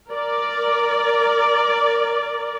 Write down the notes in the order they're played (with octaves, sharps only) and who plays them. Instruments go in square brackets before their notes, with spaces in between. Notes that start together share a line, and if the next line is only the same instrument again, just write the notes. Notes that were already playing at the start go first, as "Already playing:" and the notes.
[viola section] A#4 D5